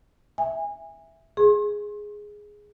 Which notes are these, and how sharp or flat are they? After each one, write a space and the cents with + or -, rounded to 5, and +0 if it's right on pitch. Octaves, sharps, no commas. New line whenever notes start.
E5 +0 G#5 -25
G#4 +0 C6 +35